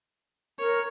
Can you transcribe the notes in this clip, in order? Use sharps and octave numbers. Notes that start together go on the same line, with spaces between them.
A#4 C#5